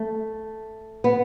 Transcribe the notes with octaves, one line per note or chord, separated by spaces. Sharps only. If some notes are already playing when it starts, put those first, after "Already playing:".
Already playing: A3
B3